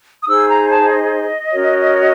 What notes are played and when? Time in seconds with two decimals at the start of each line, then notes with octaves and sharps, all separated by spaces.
0.22 D#6
0.27 D#4 G#4 C5 E6
0.48 A#5
0.69 A5
0.89 D#5
1.51 C#4 F#4 A#4 C#5